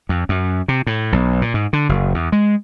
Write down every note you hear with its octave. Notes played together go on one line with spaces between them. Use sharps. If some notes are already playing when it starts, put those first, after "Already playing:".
F2
F#2
C3
A2
B1
A#2
G#2
D3
F#1
E2
G#3